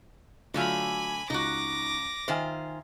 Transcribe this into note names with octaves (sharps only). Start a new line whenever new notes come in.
D3 F#3 A3 F4 F5 G#5 B5
C#2 D#4 F#4 D6 A#6
D#3 F4 C5 E5 G#5